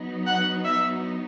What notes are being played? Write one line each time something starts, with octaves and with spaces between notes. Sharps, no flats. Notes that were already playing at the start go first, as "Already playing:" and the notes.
Already playing: F#3 B3 D#4
F#5
E5